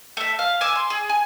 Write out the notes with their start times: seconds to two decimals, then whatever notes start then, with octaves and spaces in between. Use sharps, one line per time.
0.17 A3 E5
0.39 F5
0.61 G#5 D6 E6
0.76 C6
0.90 G#4
1.09 G#5